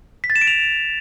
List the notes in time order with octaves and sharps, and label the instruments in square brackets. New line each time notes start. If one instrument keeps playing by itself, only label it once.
[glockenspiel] B6
A6
E7
D7
F7